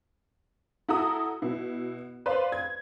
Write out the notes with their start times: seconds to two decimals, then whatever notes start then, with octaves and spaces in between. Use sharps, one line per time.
0.89 E4 F#4 A4 A#5 D#6
1.42 B2 E4
2.26 B4 C5 D5 F5 C6
2.52 G#6